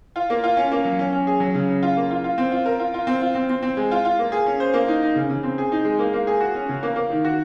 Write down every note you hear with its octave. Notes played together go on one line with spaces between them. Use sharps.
F4
A#3
F4
C#4
A#3
F#3
C#4
C#4
G#4
F#3
C#3
C#3
F4
A#3
F4
F4
C4
F4
A#4
F4
F4
C4
F4
C4
C4
C4
G#3
F4
F4
A#3
G#4
C#4
C5
A#3
D#4
D#4
C#3
C#3
C4
G#4
D#4
G#3
A#3
A#3
G#4
F#4
C#4
C#3
A#3
A#3
D#3
F#4